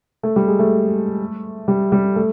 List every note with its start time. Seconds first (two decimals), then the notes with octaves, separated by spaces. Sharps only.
0.23 A3
0.36 G3
0.47 G#3
0.59 A3
1.68 G3
1.92 G3
2.16 A3